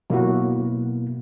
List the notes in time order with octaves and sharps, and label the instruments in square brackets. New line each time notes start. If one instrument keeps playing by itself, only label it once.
[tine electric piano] B2 A#3 E4 [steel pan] F#3 F#4